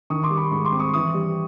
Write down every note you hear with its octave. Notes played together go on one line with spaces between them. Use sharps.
D#3 C#6 D#6
C6 D6
G3
B5 C#6
G#2 B5 C#6
C6 D6
C4
C#6 D#6
E3 C#6 D#6
G3